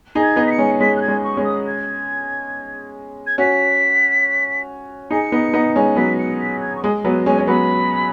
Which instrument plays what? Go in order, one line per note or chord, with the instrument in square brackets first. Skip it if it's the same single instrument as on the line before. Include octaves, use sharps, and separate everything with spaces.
[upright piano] D#4 G#4
[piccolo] G#6
[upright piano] B3 D#4
[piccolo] B6
C#7
[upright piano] G#3 C#4
[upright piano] G#3 C#4 [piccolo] B6
[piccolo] F#6
G#6
[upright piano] G#3 C#4
[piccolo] C#6
[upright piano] G#3 C#4
[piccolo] D#6
G#6
G#6
[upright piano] C#4 F#4 [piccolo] B6
[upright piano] D#4 G#4 [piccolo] C#7
[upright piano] B3 D#4
B3 D#4
G#3 C#4
[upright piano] F#3 B3 [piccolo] B6
[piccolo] C#7
B6
G#6
C#6
[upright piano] G#3 [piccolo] D#6
[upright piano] F#3 B3 [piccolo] G#5
[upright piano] G#3 C#4 [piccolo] G#5
[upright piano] C#4
[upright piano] F#3 B3 [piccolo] B5